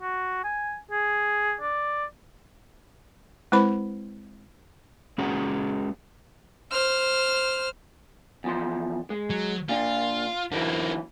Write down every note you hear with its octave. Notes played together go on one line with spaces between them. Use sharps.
F#4
G#5
G#4
D5
G#3 C4 E4 B4 C5 B5
G#3 C#4 F#4 G#4 F#5 A#5
C5 F6
E2 F3 C6
G#3
F#3
A#2 D4 F4
D3 E3 F#3 A#3 C4